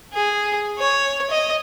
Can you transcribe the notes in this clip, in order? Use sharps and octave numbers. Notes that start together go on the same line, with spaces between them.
G#4
C#5
D#5